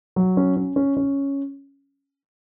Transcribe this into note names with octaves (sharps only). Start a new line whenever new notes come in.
F#3
C#4
C#4
C#4
C#4